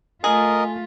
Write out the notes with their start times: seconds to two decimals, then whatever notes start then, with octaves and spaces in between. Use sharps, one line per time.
0.24 A3 F4 G#4 A#4 D#5